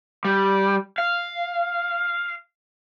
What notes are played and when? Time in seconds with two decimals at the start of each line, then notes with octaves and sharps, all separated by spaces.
0.25 G3
0.98 F5